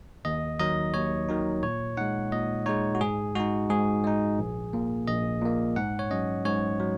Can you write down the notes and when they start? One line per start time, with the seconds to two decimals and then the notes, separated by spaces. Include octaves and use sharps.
0.25 D#2 D#5
0.60 D#3 F#3 D#4 D#5
0.94 D#2 C#5
1.29 D#3 F#3 D#4
1.63 A#2 C#5
1.97 G#3 D#4 F#5
2.32 A#2 D#5
2.66 G#3 D#4 C#5
2.95 F#4
3.01 G#2 G#4
3.35 G#3 D#4 F#4
3.70 G#2 G#4
4.04 G#3 D#4
4.39 A#1
4.73 A#2 A#3
5.08 A#1 D#5
5.42 A#2 A#3
5.76 G#2 F#5
5.99 C#5
6.11 F#3 C#4 D#5
6.45 G#2 C#5
6.80 F#3